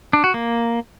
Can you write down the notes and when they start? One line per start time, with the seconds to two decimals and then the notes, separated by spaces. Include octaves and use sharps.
0.13 D4
0.24 F#4
0.34 A#3